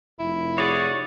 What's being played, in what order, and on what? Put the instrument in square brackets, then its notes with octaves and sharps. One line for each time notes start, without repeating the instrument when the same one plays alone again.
[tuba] F1 [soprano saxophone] E4
[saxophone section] F#4 G#4 [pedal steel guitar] C#5 D5